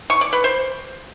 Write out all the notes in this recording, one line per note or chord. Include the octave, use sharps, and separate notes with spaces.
C#6
D5
B4
C5